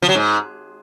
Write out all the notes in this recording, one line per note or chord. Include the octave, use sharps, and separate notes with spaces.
F3
F#3
G#2